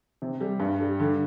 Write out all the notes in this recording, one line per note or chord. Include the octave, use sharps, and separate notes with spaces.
C3
G3
G2
G3
D3